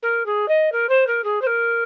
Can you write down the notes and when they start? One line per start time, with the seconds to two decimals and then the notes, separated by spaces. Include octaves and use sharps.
0.02 A#4
0.26 G#4
0.48 D#5
0.72 A#4
0.89 C5
1.07 A#4
1.24 G#4
1.41 C5
1.46 A#4